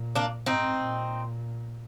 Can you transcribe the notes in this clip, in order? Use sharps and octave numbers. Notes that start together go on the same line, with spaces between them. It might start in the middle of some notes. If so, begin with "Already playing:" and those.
Already playing: A#2
A#3 D4
G#2 C4 D#4
A#2